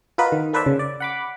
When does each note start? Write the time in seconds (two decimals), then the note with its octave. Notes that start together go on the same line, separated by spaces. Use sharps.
0.18 F4 F#4 A#4 B4 D#5
0.32 D#3
0.53 A#3 A4 B4 C5 D5 E5
0.66 C#3
0.79 D5
1.00 F#5 B5 D6